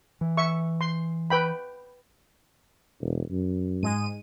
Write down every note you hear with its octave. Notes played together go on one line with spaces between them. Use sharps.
E3
E5 C#6
C6
B4 G5 B5
E1
F#2
G#2 G#3 D#7